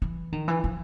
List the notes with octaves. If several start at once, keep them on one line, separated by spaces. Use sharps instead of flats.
E3
D#3
E3
F3